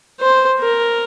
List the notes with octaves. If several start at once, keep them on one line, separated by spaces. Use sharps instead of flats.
C5
A#4